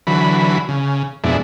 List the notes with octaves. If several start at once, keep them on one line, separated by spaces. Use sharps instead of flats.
D3 E3 F#3 B5
C#3
F2 B2 G#3 D4 E4